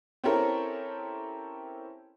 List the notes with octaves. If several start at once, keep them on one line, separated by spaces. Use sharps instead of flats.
C4 C#4 E4 G4 A4 A#4